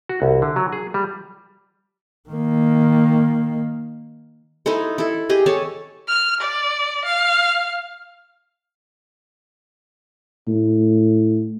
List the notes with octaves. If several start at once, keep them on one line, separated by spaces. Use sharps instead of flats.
F#4
C2
D3
F#3
G#4
G3
D#3 A#3
D#4 E4 A4 C5
E4 A4
G4 G#4 D#5
A4 C#5 G#5 A5
F6
D5
F5
A2